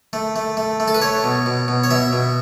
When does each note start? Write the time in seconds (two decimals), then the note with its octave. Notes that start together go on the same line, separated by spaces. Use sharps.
0.13 A3
0.36 A3
0.57 A3
0.80 A3
0.88 A4
0.94 B4
1.02 A3 C#5
1.24 B2
1.46 B2
1.68 B2
1.84 C#5
1.91 B2 E5
2.13 B2